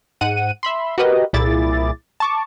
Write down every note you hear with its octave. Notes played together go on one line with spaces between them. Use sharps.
G#2 F#5 D#7
E5 B5 C6
F#4 G4 A#4 B4 D#5
C2 A#2 E4 G#4 D6 A6
A5 C#6 D6